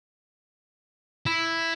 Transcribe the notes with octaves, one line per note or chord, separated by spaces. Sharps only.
E4